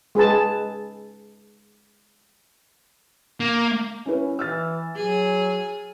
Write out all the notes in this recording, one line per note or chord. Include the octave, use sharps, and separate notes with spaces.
G#3 G#4 B4 A5
A#3
C#4 E4 B4
E3 E6 F6 A6
F#3 G#4